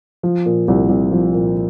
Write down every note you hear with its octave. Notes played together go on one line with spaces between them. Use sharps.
F3
A#2
C2
C2
F3
A#2